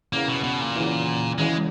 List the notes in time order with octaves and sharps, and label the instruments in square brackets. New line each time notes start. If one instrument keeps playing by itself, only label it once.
[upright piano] E2 C#3 E3 [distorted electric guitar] A#3
[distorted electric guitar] B2
B2
A#2
[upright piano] E2 C#3 E3
[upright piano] E2 C#3 E3 [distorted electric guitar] G#3